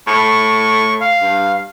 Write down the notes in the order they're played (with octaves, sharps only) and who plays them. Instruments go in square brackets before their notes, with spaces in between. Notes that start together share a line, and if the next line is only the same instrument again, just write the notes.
[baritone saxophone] A2 [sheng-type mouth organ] C#6
[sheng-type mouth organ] F5
[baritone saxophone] G2